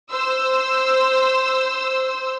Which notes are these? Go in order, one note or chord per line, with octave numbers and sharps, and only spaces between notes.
C5 E6